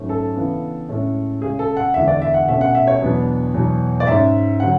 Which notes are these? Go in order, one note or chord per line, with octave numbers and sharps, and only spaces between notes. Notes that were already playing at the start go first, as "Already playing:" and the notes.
Already playing: G#2 F#3 A3 C#4
A4
C#3 E3 B3 D4
A2 G#3 C#4
C#3 G#3 C#4 G#4
A4
F#5
E2 D3 G#3 D4 E5
D5
E5
F#5
B2 A3 C#4 E5
F#5
E5
C#5
E2 B2 F#3 B3 D4
E2 B2 F#3
D5
G#2 G#3 C#4 E5
D3 F#3 F#5